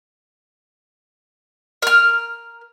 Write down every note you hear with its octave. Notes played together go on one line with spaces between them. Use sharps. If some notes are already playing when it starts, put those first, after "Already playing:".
A#4 F6